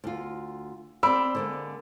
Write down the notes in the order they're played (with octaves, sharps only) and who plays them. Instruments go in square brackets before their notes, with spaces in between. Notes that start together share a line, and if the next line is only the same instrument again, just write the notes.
[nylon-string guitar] D2 F4
[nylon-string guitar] C4 D5 [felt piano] B5 E6
[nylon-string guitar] D3 G#3 A#3